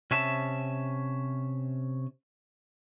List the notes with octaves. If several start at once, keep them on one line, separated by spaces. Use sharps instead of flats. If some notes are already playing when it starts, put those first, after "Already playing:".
C3 C#4 E5 A5